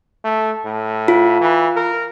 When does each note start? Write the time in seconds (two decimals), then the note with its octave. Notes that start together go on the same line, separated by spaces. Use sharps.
0.24 A3
0.65 A2
1.08 F4
1.41 E3
1.76 A#4